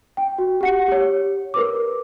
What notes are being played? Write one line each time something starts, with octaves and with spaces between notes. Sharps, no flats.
G5
F#4
G4 F#5 C#7
G4 C#5
A#4 B4 D6